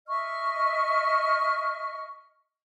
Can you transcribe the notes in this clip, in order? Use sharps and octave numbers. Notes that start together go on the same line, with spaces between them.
D#5 E5 C#6 F6